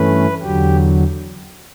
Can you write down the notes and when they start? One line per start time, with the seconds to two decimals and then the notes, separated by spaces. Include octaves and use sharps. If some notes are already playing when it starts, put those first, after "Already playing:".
Already playing: G2 E3 A3 C#4 B4
0.42 E2 D3 F#3 G4